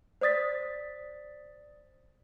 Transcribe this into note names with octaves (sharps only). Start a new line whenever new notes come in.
C5 D5 D#6 A6 B6